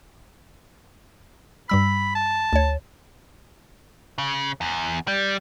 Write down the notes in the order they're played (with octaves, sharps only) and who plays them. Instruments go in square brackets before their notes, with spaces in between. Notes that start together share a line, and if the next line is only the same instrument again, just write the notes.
[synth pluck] G2 G3 E6 [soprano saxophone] B5
[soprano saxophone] A5
[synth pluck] D2 C#5
[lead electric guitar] C#3
E2
G3